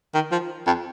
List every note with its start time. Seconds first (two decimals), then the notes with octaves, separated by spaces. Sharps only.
0.14 D#3
0.32 F3
0.67 F2